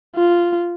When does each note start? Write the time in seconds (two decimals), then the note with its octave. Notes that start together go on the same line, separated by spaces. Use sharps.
0.16 F4